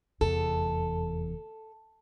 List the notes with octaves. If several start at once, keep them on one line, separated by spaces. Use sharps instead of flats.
F1 E2 A4